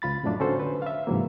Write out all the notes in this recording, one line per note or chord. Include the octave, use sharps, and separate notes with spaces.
C#2 F4 B5 A6
F2 A2 F#3 A3 D4 F4
D3 C#4 F#4 A4 C5
D3 B4
E5 F5
G#2 C3 E3 F#3 A#3